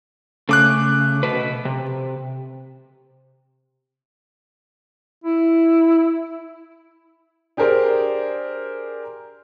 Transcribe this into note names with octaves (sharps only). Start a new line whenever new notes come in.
C#3 A3 D6 F#6
B2 B4
C3
E4
D4 G4 G#4 A#4 C5 D5